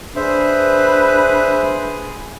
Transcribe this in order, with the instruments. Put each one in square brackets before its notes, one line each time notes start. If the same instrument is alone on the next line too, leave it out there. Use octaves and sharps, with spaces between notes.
[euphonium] D4 [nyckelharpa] G#4 [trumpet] B4 [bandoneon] C5 E5